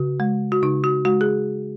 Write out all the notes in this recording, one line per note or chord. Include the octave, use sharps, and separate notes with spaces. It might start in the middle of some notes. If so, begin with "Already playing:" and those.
Already playing: C#3 F#4
G#3
F#4
C#3 D#4
F#4
G#3 F#4
G#4